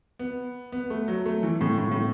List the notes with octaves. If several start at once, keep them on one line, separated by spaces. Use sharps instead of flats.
B3
B3
A3
F#3
A3
E3
A2
A2
A2